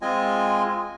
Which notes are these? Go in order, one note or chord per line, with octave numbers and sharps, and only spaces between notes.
G#3 C4 F4 D#5 G#5